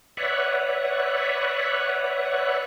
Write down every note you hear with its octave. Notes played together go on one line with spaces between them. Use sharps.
B4 C#5 D5 E5 F#5